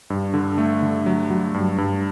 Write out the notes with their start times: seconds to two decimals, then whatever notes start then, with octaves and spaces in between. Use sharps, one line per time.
0.10 G2
0.34 D3
0.58 A3
0.82 D3
1.06 F#3
1.30 F#3
1.54 G2
1.78 G2